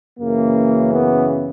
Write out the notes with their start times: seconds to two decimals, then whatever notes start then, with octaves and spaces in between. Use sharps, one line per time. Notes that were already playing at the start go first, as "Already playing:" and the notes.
0.20 F#2 C#3 E3 A#3
0.94 B3